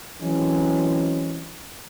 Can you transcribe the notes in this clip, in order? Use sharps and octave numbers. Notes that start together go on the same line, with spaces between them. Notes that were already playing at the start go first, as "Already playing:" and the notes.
E3 F#3 G#3 C4 C#4